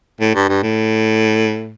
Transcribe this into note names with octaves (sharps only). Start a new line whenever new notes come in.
A2
G2
G2
A2